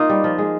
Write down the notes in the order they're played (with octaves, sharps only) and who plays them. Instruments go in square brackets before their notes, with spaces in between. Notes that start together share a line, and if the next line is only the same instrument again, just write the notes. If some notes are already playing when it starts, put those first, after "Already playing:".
Already playing: [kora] A#3 D#4 F4
G3
F3
G#3